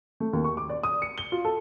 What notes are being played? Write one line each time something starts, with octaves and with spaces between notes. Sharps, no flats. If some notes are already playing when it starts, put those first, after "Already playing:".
A3
D#2
C#6
D6
D5
D#6
C#7
G7
F4
A4